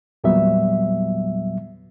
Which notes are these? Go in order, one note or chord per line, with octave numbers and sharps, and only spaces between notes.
E2 A#2 F#3 G3 B3 E5